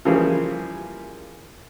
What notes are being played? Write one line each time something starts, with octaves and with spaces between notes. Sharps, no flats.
C#3 E3 F3 G3 A#3 G#4